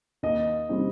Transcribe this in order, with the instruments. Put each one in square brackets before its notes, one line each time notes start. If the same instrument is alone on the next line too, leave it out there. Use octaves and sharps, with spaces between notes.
[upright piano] D#2 [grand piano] D#5
[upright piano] C#3 G3 C4 D#4